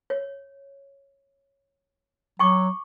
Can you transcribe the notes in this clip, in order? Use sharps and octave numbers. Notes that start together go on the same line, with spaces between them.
C#5
F#3 G5 C#6 D6